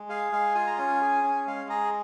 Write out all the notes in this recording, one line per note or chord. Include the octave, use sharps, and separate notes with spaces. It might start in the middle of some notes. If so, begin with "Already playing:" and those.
Already playing: G#3
G#4 F5
G#3 F5
F4 G#5
A#5
C#4 G#5
G#4
C#4
G#3 F5
G#4 A#5